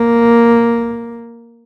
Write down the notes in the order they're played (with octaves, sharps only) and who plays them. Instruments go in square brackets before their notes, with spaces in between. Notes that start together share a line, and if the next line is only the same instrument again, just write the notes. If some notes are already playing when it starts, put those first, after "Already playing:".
Already playing: [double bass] A#3